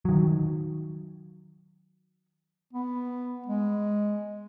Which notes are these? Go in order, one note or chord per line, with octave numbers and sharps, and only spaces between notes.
D#3 F#3
B3
G#3